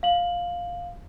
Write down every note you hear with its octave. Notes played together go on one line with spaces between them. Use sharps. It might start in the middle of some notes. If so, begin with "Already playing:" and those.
F5 F#7